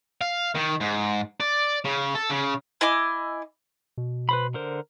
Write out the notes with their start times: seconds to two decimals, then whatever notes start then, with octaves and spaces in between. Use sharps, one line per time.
0.21 F5
0.55 D#3
0.81 G#2
1.40 D5
1.85 C#3
2.15 A4
2.30 C#3
2.81 E4 D#5 G#5 D6
3.97 B2
4.29 B4 C5 B5
4.54 D3 A#4 C5